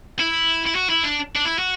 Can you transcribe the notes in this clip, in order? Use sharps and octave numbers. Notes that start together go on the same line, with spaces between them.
E4
E4
F#4
E4
D4
D4
E4
F#4